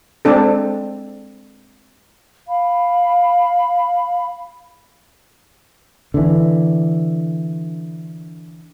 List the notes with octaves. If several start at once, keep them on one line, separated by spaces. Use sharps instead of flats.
G#3 C4 D4 A4
F5 B5
D3 E3